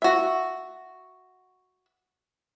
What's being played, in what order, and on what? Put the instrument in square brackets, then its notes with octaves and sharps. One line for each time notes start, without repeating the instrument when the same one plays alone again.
[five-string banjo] F#4 E5